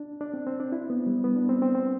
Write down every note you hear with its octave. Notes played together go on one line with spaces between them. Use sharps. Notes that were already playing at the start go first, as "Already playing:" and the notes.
Already playing: D4
D4
C4
C4
D4
E4
B3
G3
B3
D4
C4
C4
C4